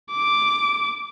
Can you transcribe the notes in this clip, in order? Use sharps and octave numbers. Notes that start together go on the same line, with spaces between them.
D6